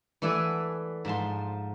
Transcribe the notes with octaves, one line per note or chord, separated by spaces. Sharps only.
E3 A3 D5 E5 F#5 G#5
G#2 F3 A5 C6